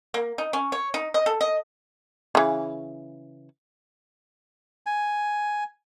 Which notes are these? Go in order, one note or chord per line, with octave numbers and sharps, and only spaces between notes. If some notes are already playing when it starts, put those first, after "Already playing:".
A#3
D#4
C#4
C#5
D#4
D#5
A4
D#5
C#3 E3
G#5